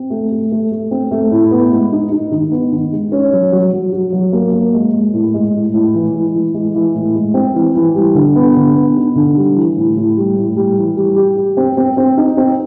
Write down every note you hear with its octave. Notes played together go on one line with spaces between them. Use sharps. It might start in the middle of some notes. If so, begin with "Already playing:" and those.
Already playing: C4
A3
A3
A3
A3
C4
A3
A2
B3
G#3
D#4
D#4
D#3
B3
D#3
G#3
C#4
F#3
F#3
F#3
F#4
F#3
A#3
A#3
G#3
G#3
A2
G#3
A2
A2
E3
G#3
E3
G#3
E3
A2
G#3
C4
E3
E3
G3
D3
B3
D3
B3
D#4
D3
G3
E3
A2
A2
G3
A2
G3
E3
G3
G4
G4
C4
C4
C4
D#4
C4